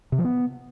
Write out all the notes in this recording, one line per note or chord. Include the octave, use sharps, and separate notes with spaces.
C3
F3
B3